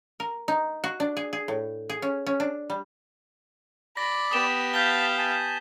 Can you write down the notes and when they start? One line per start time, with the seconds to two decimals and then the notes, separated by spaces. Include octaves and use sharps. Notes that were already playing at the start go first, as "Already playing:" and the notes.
0.20 A#4
0.48 D#4
0.84 F#4
1.00 D4
1.17 G#4
1.33 G#4
1.48 A2
1.90 G#4
2.02 C#4
2.27 C#4
2.40 D4
2.70 G3
3.97 D5 B5 D6 A#6
4.31 B3 G4 D#6 E7
4.74 F5 A5 G6 B6 G7
5.18 G#5 A5